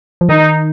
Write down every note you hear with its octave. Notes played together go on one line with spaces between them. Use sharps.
F3
D#3 D#4